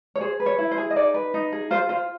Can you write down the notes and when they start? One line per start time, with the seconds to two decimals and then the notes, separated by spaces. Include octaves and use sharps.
0.16 C#5
0.21 G#4 C5
0.40 B4
0.46 C#5
0.59 E4
0.71 C5
0.78 G#4
0.91 D#5
0.96 D#4 D5
1.14 B4
1.34 D#4
1.52 G#4
1.71 F4 C5
1.89 F4 C5